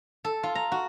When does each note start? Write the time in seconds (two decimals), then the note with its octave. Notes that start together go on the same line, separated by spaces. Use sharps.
0.24 A4
0.43 F4
0.55 A#5
0.72 F#4